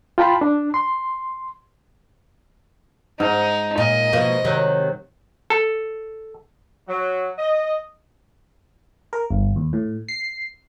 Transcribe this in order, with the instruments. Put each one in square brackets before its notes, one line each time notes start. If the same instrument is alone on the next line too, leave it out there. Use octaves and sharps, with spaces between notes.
[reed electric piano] F4 G5 A5 B5 C6
D4
C6
[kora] G#2 [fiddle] D#4
[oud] A#2 [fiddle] D#5
[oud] B2 F3 A#3
C3 D#3 F#3
[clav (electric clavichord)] A4
[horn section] F#3
D#5
[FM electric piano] A#4
G1
D#2
A2
C7